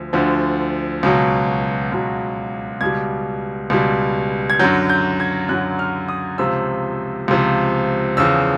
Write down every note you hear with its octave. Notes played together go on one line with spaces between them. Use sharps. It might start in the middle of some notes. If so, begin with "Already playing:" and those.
Already playing: D2 D3 F3
D2 D3 F3
C#2 B2 F#3
C#2 B2 F#3
C#2 B2 G3 G#6
C#2 B2 G3
G#6
F#2 D3 F#3 G6
G6
G#6
F#2 D3 F#3 F#6
F6
D#6
C#2 C3 F3 E6
C#2 C3 F3
E2 C#3 F3 E6